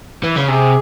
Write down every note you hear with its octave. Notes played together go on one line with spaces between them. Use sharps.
E3
C#3
C3 G#4